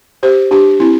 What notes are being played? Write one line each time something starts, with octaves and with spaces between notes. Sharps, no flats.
G4 C5
D4 G4
C4 E4